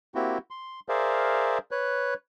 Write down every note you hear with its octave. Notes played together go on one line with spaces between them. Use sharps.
A#3 C4 E4 F#4 G4
C6
G#4 A#4 C5 D5 E5 F5
B4 C#5 F#6